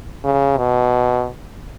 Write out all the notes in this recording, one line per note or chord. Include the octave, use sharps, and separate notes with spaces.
C#3
B2